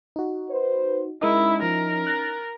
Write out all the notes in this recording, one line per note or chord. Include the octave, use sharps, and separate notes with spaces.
D#4 F#4
B4 C5
G#3 C#4 D#4 E4 A#4 D#5
F3 A#4
F#6 A6 A#6